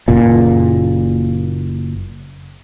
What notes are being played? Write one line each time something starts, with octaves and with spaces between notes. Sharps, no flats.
F#1 A#2